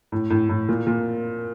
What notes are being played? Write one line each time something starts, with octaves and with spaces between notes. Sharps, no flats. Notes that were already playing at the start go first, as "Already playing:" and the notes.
A2
A2
A2
A#2
A#2